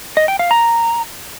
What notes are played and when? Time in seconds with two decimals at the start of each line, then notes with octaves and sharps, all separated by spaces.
0.17 D#5
0.28 G5
0.39 F5
0.51 A#5